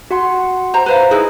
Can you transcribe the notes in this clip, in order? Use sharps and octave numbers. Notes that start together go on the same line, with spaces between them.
F#4 F#5 C6
C5 A#5
B4 C5 F5 A#5
D#4 E4 G#4 B4